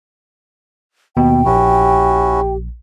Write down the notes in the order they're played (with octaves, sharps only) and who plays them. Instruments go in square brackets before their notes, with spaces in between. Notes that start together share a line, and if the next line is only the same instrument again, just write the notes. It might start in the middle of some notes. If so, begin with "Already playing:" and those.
[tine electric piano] D#2 B2 [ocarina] B3 [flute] G5
[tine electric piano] A#1 [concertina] C#4 E4 F#4 [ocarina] G4